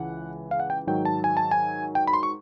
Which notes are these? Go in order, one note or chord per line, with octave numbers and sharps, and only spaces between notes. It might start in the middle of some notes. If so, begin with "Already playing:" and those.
Already playing: C#2 C#3 E3 F#5
F5
F#5
G5
G#2 D#3 F#3 G5
A5
G#5
A5
G#5
G5
B5
C6
C#6